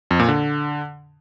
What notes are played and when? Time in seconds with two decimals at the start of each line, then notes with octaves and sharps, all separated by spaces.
0.11 F2
0.19 A#2
0.28 D3